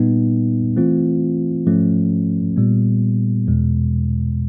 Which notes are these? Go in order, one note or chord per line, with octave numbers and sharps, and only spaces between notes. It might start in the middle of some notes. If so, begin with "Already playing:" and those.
Already playing: A#2 G3 B3 D#4
E3 A3 C4 F4
G#2 F3 A3 C#4
A#2 G3 B3
E2 B2 G#3